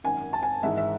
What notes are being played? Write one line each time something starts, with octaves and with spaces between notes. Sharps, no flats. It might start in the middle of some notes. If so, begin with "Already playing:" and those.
G#1 F#2 D#3 G#5
A5
G#5
G#1 G#2 E3 G#3 E5
E5